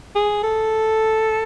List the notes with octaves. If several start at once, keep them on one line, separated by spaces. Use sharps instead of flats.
G#4
A4